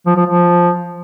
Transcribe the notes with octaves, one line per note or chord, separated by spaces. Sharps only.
F3
F3
F3